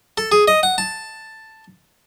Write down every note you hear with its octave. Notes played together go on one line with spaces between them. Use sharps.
A4
G#4
D#5
F#5
A5